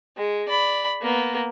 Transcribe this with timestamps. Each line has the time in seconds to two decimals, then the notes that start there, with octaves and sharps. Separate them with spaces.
0.17 G#3
0.49 D5 B5
1.02 A#3 B3